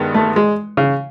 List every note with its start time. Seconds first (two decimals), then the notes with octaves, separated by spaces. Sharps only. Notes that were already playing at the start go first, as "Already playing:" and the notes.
Already playing: G2 D#3 G#3 B3
0.15 A3
0.36 G#3
0.77 C#3